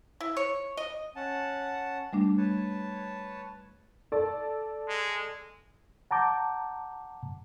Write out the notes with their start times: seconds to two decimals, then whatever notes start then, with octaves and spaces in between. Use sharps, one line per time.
0.21 E4
0.37 C#5
0.77 D#5
1.16 C#4 F#5 A5
2.13 G3 A3 D4
2.37 B4 C#5 A5
4.12 A4 D5
4.88 G#3
6.11 F#5 A5 A#5 D6 G6